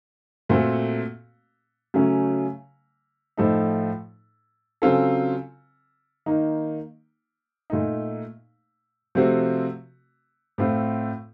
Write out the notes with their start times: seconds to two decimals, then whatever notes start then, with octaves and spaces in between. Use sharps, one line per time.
0.49 A#2 A3 C4 F#4 A4
1.94 C#3 F#3 A3 C#4
3.37 A2 F3 A3 D#4 A4
4.82 C#3 F#3 C4 F4 A4
6.26 D#3 A#3 D#4
7.70 A#2 A3 D#4
9.15 C3 F3 A3 C4 F#4
10.58 A2 A3 C4 F4